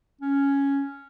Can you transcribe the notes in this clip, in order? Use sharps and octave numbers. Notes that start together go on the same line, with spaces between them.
C#4